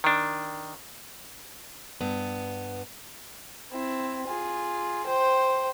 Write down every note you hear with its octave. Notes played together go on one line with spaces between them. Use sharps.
D#3 D4
G2 B3
C4 E4
F4 G#4
C5 G5